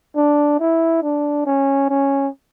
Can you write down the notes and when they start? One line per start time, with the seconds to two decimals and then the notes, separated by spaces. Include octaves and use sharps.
0.16 D4
0.60 E4
1.03 D4
1.46 C#4
1.89 C#4